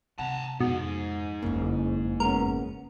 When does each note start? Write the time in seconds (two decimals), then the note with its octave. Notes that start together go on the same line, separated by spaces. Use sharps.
0.19 C3 F#5 A5 A#5
0.61 B1 F2 G#2 B2
1.42 F#1 F2 C#3 A#3
2.20 G#3 B3 C#4 A#4